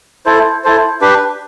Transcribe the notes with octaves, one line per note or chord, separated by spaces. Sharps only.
E4 A4 C5
E4 A4 C5
D4 G4 B4